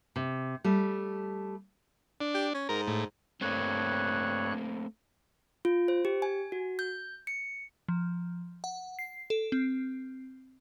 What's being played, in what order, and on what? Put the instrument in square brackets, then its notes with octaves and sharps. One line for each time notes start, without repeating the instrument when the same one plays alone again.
[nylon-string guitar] C3
G3 A3
[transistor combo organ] D4
[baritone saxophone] G4
C#4
[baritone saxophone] G#2 [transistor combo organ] A#4
[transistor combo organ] A2
[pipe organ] G2 C#5 F#6 [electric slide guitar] A3 A#3 C4
[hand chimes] F4
C5
G4
G#5
F#4
G6
C#7
[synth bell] F3
F#5
C7
A4
C4